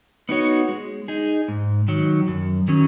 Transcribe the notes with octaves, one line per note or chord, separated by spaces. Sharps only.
B3 D#4 F#4 C#5
G#3
D#4 G#4
G#2
D#3 F#3
F#2
D#3 F#3 C#4